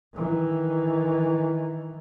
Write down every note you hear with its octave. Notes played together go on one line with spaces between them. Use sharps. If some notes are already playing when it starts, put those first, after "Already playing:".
D#3 E3